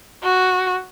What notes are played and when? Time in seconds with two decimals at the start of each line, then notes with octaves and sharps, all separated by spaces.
0.24 F#4